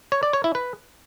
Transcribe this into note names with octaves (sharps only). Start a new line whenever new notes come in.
C#5
D5
C#5
E4
B4